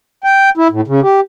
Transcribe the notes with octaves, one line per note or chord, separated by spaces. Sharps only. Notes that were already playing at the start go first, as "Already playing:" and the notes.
G5
E4
A2
C#3
G4